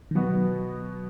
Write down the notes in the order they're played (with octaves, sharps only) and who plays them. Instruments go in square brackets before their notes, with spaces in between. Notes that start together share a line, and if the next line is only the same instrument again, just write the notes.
[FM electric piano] D#3
[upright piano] B2 B3 F#4 [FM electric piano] F#3